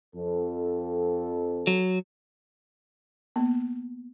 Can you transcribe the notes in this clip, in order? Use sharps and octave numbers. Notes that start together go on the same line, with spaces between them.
F2 A4
F#3
A#3 B3